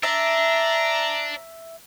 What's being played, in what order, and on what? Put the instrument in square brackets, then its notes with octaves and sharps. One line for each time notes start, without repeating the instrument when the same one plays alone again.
[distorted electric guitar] D4 [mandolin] E5 [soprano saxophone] A#5